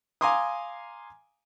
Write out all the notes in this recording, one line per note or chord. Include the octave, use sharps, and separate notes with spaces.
F5 G#5 A#5 C6 D6 D#6